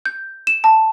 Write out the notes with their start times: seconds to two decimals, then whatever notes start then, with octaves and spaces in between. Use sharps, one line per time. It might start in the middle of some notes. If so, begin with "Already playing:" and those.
0.05 G6
0.47 E7
0.64 A5